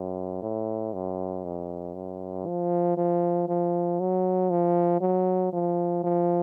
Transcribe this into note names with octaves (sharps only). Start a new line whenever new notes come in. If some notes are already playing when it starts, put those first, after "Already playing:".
Already playing: F#2
A2
F#2
F2
F#2
F3
F3
F3
F#3
F3
F#3
F3
F3